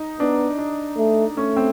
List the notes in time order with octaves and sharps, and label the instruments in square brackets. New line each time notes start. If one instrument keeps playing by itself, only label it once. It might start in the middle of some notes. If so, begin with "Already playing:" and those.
Already playing: [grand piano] D#4
[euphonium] B3 [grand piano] D4
[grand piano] D4
[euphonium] A3
[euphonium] A3 [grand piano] C#4
[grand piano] C4